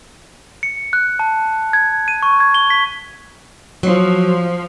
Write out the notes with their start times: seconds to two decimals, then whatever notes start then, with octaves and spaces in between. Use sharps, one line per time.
0.63 C#7
0.93 F#6
1.19 A5
1.73 G#6
2.08 D#7
2.23 C#6
2.40 G#6
2.55 G7
2.70 B6
3.83 F3 F#3